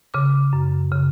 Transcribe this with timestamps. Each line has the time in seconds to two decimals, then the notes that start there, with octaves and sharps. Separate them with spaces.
0.14 C#3 D6
0.53 F#2
0.92 C#3